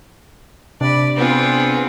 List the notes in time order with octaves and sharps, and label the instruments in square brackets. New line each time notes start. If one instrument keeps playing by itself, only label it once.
[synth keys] C3 D4 [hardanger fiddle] D5 B5
[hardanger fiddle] B3 G#4 [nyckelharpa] C4 F4